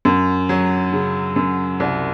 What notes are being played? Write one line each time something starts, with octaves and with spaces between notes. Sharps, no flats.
F#2
F#3
C#3
F#2
C2